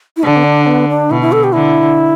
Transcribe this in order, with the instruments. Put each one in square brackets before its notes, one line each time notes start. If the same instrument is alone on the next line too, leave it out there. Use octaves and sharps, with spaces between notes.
[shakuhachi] E4
[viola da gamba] D3 [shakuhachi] D4
[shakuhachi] B3
D4
B3
D4
[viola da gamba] B2 [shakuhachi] E4
[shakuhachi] E4
A4
G4
[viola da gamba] D3 [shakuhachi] E4